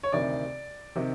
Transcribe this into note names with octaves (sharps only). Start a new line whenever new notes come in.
C#5
D2 C3 D#3 D5
C3 D#3